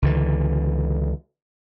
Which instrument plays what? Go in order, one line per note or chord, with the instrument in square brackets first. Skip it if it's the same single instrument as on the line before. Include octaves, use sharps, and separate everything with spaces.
[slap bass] C#2 D3 E3